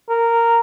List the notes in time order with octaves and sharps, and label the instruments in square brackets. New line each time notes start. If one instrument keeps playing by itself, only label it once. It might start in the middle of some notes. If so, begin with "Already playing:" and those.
[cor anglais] A#4